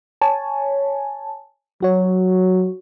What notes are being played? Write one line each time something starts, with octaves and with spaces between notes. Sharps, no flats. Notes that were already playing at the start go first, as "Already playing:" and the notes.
C#5 G#5 A5
F#3 F#4 C#5